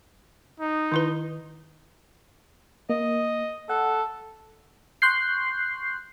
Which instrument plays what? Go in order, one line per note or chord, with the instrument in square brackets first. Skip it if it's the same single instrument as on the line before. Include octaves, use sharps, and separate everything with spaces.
[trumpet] D#4
[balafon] D#3 E4 B4
[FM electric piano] A#3 [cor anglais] D#5
[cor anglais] A4 [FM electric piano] F#5
[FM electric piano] C6 C#6 F#6 G6 C7